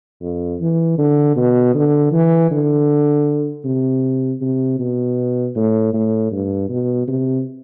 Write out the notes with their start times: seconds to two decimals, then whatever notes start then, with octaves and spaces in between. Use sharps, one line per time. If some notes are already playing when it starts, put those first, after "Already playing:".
0.21 F2
0.60 E3
0.98 D3
1.36 B2
1.74 D3
2.12 E3
2.51 D3
3.64 C3
4.42 C3
4.79 B2
5.56 A2
5.93 A2
6.31 G2
6.69 B2
7.08 C3